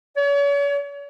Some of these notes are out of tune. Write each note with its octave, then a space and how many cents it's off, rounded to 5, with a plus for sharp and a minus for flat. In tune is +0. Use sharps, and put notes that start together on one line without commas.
C#5 +40